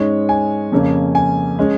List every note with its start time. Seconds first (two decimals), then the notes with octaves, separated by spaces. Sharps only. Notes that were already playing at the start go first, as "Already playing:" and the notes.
Already playing: G#2 G#3 C#4 C#5
0.29 G#5
0.72 F2 C#3 A#3 C#4
1.15 G#5
1.59 G#3 C#4